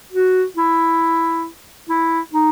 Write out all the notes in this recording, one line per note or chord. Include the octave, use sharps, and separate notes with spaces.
F#4
E4
E4
D#4